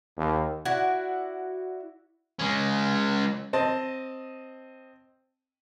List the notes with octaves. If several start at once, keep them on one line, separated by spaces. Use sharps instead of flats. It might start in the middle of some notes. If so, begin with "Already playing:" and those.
D#2
E4 F#4 D5
G#3 C#4
C4 D#5 A5